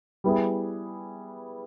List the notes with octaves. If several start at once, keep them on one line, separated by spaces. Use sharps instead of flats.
G3 B3 E4 G#4